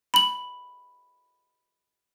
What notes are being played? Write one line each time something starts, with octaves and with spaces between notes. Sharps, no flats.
B5 F#7